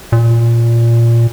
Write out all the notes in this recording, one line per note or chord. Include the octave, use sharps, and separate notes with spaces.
A#2